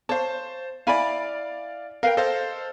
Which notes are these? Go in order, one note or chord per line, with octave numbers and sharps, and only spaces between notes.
C5 C#5 F5 A5
E4 D5 F5 G#5 B5
A#4 B4 F5 G5
A4 C5 D#5 F5